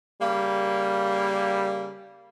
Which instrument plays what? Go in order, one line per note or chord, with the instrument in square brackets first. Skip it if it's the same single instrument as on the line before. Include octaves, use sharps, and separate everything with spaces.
[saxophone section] C#3 A#3 [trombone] G3